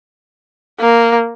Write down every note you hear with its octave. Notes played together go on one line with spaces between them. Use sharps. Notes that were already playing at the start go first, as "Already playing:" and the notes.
A#3